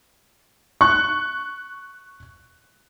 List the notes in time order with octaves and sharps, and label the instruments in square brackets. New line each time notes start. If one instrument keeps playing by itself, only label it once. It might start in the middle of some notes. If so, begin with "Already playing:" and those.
[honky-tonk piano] C#6 F#6